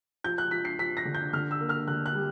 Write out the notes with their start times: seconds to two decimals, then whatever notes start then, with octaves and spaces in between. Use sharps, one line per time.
0.24 F3 G6
0.38 F#6
0.51 F3 B6
0.65 C7
0.78 F3 B6
0.97 A#6
1.05 D3
1.14 G6
1.33 D3 F6
1.51 E6
1.61 A#3
1.69 F6
1.88 D3 F#6
2.06 F#6
2.15 G3